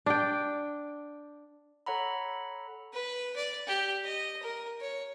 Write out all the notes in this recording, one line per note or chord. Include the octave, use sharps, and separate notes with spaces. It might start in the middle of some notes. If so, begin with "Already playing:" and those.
D4 G5
A4 C#5 F#5 A#5 B5
B4
D5
G4
D#5
A#4
C#5